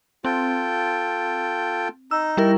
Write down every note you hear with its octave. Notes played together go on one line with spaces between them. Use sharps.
C4 F4 A4 G5
D#4 E6
G3 E4 A#4